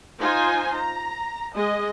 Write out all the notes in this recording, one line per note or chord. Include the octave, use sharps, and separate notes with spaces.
D#4 F4 C5 G#5
A#5
G#3 D#5